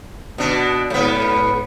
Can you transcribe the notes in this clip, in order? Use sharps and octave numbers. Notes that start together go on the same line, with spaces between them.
B2 D4
G#2 B3